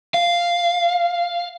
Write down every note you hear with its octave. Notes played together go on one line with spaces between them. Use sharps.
F5